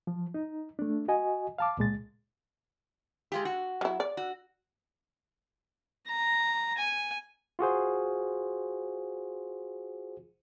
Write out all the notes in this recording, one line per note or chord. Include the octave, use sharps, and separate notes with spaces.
F3
D#4
A3 D4
F#4 D#5 G#5
F5 A5 D6
C#2 A#2 G#3 A6
G#3 F4 G4
F#4
F#3 E4
D5
F#4
A#5
G#5
F4 F#4 G#4 C5